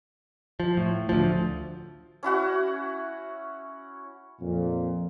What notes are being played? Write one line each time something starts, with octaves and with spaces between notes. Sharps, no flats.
F3
A2
D2 F3
C#4 E4 F#4 F#5
F2 A#2